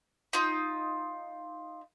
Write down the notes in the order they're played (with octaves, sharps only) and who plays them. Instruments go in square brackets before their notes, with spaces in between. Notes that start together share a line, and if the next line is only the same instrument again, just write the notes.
[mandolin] D#4 F4